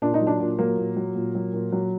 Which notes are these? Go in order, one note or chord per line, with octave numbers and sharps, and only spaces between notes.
A#2 D4
D#4
F#3
D4
A#2
F#3 A#3
A#2
F#3
A#2
F#3
A#2
F#3